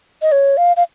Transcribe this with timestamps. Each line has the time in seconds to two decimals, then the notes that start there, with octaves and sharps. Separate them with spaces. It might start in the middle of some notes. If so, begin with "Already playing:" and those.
0.22 D#5
0.32 C#5
0.57 F5
0.77 F5